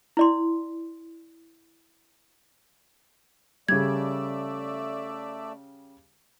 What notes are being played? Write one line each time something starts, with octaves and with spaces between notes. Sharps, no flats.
E4 D5 C6
C#3 G3 A3 D5 E5 G#6